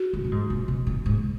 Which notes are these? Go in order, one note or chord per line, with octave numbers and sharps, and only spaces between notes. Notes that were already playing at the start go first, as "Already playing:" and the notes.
Already playing: F#4
G#2
A#2
G#2
A#2
B2
A#2
G#2